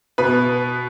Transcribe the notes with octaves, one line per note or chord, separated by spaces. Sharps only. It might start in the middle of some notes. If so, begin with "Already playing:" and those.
B2 B4